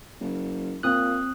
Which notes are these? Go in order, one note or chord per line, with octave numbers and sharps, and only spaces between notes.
F#1
A#2 C4 D#6 F#6